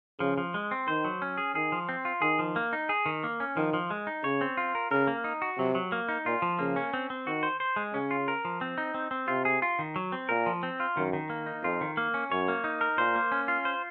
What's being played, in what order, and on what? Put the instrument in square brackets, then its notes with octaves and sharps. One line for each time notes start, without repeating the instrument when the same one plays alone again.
[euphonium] C#3 [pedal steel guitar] F3
[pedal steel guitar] F3
G#3
C4
[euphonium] D#3 [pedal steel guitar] C5
[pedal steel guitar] F#3
C#4
G#4
[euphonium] D#3 [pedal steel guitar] G#4
[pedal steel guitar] F3
C4
F4
[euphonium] D#3 [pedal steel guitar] G#4
[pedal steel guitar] F3
A#3
D#4
G#4
D#3
A#3
C#4
[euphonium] D#3 [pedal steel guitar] F3
[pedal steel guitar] F3
G#3
D#4
[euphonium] C#3 [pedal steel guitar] C#5
[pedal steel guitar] C4
F4
A#4
[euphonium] C#3 [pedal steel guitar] A#4
[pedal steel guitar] A#3
D#4
F#4
[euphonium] C3 [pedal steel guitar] F#3
[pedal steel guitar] F#3
A#3
D#4
[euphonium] A#2 [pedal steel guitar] F4
[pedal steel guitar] F3
[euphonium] C#3 [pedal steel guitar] A#3
[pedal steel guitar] C#4
C4
C4
[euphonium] D#3 [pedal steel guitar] F#4
[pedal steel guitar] C5
C5
G#3
[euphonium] C#3 [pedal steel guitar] C#4
[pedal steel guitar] F4
A#4
F3
C4
D#4
C4
C4
[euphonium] C3 [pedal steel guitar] F4
[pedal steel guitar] G#4
F4
D#3
F#3
C4
[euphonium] A#2 [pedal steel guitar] A#4
[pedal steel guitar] F3
C4
F4
[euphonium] F#2 [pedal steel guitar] D#3
[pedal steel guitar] D#3
A#3
D#4
[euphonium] F2 [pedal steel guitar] F4
[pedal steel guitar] D#3
A#3
C#4
[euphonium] F#2 [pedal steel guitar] C#5
[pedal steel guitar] A#3
D#4
A#4
[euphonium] A#2 [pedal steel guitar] C5
[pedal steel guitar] A#3
C#4
F4
C5